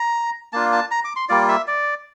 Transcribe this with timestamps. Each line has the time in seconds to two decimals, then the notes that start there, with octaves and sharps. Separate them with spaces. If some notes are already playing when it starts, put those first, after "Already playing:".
Already playing: A#5
0.53 A#3 D4 F4 A5
0.72 A5
0.91 A#5
1.04 D6
1.16 C6
1.29 G3 A#3 F4 D5
1.48 E5
1.68 D5